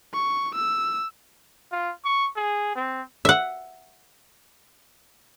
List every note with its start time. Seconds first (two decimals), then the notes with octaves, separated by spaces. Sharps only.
0.13 C#6
0.55 E6
1.72 F4
2.05 C#6
2.36 G#4
2.76 C4
3.25 E5 F#5